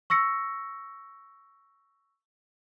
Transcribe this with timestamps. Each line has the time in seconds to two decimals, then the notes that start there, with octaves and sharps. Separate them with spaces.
0.10 C#6 E6 A#6 C#7